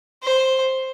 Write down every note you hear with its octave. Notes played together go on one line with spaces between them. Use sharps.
C5